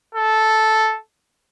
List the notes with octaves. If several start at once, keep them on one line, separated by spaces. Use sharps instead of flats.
A4